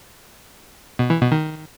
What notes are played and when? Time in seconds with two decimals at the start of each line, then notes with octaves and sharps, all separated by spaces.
0.99 B2
1.10 E3
1.21 B2
1.32 D#3